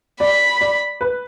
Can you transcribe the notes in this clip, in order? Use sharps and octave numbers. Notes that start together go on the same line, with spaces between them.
D5 B5
D5
B4